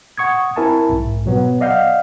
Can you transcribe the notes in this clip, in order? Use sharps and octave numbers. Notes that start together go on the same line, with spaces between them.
F#5 C#6 D#6 G#6
C4 E4 A#4 E5 G#5 A5
B1 G#2
B2 F#3 B3
D5 D#5 F5 F#5 G6